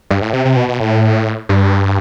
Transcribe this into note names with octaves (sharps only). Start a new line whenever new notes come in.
G2
A2
C3
C3
B2
B2
A2
G2